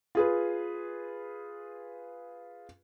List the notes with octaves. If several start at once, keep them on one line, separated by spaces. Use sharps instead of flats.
F4 G#4 B4